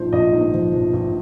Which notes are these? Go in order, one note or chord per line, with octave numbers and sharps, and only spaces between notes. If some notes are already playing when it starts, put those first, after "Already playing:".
Already playing: A#1 G#2 F3 C5
A#1 D#5
G#2
F3
A#1
A#1